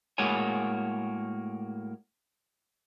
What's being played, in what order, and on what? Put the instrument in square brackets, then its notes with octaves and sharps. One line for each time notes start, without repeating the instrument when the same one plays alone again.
[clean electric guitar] A2 G#3 A#3 F#4 C#5 G#5